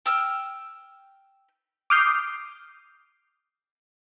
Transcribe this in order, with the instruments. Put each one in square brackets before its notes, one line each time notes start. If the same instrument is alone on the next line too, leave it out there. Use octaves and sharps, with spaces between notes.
[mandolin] G5 E6 F6
[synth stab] D6 D#6 F6 G6 C7